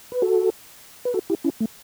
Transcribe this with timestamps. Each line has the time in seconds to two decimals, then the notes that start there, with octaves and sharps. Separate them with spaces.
0.12 B4
0.22 F#4 A4
1.05 B4
1.14 F#4 A4
1.30 E4 G4
1.44 C#4 E4
1.60 A3